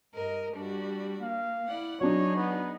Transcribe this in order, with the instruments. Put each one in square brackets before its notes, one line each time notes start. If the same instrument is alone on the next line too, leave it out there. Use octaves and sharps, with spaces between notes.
[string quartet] G2 A#4 D#5
G3 D4 F#4
[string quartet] A#3 [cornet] F5
[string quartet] E4 D5 F#5
[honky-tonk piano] F#3 D4 [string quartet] D#4 G#4 [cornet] C#5
[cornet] B3